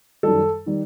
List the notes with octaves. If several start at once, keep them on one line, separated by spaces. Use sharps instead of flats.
F#2 D#3 G3 A4
D#3 G3